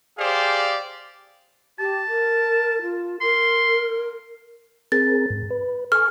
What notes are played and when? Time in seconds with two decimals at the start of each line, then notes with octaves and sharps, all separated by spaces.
0.18 G4 G#4 C5 D5 F5
1.79 G4 A5
2.08 A#4
2.82 F4
3.21 A#4 C6
4.92 C4 G#4 A#4 A6
5.30 G#2
5.50 B4
5.92 A4 G#5 C#6 F6